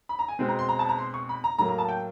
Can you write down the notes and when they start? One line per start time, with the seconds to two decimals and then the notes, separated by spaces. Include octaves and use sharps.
0.09 B5
0.19 A#5
0.28 G#5
0.39 B2 G#3 C4
0.49 A#5
0.59 C6
0.69 A#5
0.79 A5
0.89 A#5
0.98 C6
1.14 C#6
1.29 B5
1.44 A#5
1.59 A2 F#3 A#3 A#5
1.69 A#5
1.78 A5
1.89 G5